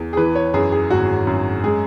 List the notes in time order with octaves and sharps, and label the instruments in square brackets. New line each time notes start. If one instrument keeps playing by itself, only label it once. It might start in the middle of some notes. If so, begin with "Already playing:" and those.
Already playing: [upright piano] E2
G#4
E3 B4
C#5
F#2 G#4
G#4
G#1 F#4
F#2
G#3 G#4